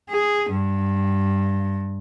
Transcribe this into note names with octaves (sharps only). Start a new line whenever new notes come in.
G#4
G2